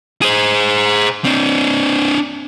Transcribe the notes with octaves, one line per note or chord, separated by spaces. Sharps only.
G#4 C5
C4 D4